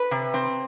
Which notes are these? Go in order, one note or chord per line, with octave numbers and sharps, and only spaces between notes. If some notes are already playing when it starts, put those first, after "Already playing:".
Already playing: B4
C3
C4